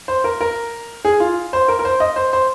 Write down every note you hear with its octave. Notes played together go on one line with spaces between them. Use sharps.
C5
A#4
A#4
G#4
F4
C5
A#4
A#4
C5
D#5
C5
C5